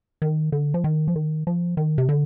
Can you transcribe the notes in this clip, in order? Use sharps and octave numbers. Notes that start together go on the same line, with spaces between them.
D#3
D3
F3
D#3
F3
D#3
F3
D#3
C3
D3